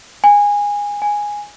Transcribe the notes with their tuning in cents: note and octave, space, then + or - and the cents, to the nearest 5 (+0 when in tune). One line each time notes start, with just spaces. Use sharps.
G#5 -20
G#5 -5